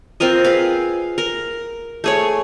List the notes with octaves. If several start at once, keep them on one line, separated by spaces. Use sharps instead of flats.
C4 F4 A#4 D#5
G#4 B4 F5
A#4
A3 G#4 C#5